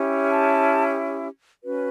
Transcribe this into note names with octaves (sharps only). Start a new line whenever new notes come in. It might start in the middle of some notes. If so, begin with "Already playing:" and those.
Already playing: C#4 E4 G4
A5
C#4 F#4 B4